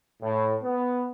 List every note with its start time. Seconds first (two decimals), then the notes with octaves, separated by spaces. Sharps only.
0.21 A2
0.62 B3